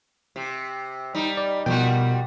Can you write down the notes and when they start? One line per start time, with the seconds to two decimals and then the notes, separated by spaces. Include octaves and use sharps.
0.36 C3
1.15 G3 D#4
1.37 D5
1.66 B2 F3 G3 F#4 A#4 G5